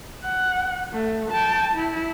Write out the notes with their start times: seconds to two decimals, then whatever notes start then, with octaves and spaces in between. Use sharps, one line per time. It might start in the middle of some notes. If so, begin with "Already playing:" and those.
0.24 F#5
0.93 A3
1.31 G5 A5
1.73 E4